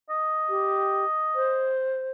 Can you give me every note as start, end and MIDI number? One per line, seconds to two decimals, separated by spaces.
0.10 1.76 75
0.49 1.05 67
1.35 2.12 72